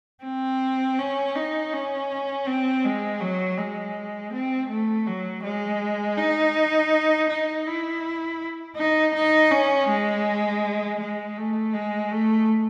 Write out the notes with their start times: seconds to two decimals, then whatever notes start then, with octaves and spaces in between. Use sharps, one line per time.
0.24 C4
0.99 C#4
1.36 D#4
1.73 C#4
2.47 C4
2.84 G#3
3.21 F#3
3.58 G#3
4.33 C4
4.69 A3
5.07 F#3
5.43 G#3
6.18 D#4
7.30 D#4
7.66 E4
8.77 D#4
9.14 D#4
9.52 C#4
9.89 G#3
11.00 G#3
11.38 A3
11.74 G#3
12.12 A3